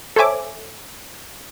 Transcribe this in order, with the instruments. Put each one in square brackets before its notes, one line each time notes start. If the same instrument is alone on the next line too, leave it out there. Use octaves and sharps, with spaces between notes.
[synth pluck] A4 C5 C#5 E5 G#5 D6